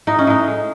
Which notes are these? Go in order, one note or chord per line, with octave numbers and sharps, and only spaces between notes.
A2 D#4
C#4
A2 D#4
G#3